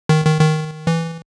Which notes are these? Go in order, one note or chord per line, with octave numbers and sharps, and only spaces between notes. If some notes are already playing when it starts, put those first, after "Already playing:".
D#3
D#3
D#3
E3